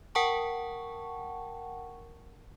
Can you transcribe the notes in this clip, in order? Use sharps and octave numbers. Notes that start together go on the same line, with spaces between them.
A#4 F#5 G5 A5 C#6